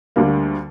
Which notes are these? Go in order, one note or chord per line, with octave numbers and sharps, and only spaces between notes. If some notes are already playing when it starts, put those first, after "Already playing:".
D2 D3 G3 A#3